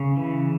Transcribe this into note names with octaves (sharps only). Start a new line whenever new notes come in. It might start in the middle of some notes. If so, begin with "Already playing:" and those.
Already playing: C#3 C#5
E3